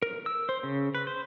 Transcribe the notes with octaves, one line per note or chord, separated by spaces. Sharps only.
A#4
E6
C5
C#3
B4
C5